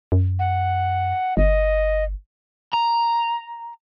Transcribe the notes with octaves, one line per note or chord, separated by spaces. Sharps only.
F#2
F#5
G1 D#5
A#5